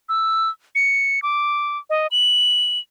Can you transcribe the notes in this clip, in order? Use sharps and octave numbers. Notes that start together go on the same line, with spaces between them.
E6
C#7
D6
D#5
F#7